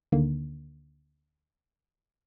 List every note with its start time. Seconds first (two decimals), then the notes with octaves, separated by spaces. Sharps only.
0.12 D2 D3 D#3 A#3